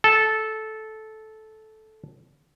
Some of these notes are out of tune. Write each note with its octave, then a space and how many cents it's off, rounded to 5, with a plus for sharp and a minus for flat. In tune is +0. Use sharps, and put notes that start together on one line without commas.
A4 -15